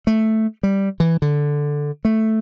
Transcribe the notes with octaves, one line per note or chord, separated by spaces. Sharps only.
A3
G3
E3
D3
A3